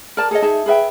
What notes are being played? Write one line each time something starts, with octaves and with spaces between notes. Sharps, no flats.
A#4 D5 A5
G#4 A4 C#5 D#5
D#4 G#4 E5 A5
G#4 B4 E5 G5